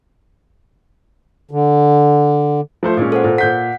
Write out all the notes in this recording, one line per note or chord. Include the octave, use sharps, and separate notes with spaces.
D3
F3 A3 C5
A#2 G#3 C#4
A4 C5 F#5
A#2
A#2 F#5 G6 B6